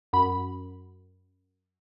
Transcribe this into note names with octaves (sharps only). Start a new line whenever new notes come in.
F#2 B5